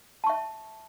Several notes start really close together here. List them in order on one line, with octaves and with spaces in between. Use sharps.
A5 C#6 E5